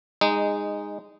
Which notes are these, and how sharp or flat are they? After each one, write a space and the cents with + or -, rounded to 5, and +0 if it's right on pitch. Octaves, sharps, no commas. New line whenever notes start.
G#3 -20 D#4 -5